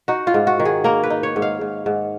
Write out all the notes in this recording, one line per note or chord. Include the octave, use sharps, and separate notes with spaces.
D#4 F#4
F4
G#2
F#4
D#3
G#4
A#3 A#4
B4
D#4
C#5
G#2
F5
G#2
G#2